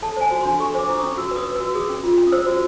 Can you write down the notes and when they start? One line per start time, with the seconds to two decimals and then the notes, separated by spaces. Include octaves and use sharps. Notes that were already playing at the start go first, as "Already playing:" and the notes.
0.02 A4 A5
0.17 C5 G#5
0.31 F#4
0.41 C6
0.45 D4
0.59 A4 C#6
0.74 C5 C#6 D6
0.89 E4
0.98 D#6
1.02 C#4
1.17 F#4 E6
1.31 B4 D#6
1.46 B4
1.56 E6
1.60 F#4
1.75 G#4 D#6
1.89 C#4
2.04 F4
2.17 C#4
2.27 D#6
2.32 C5 E6
2.47 F#4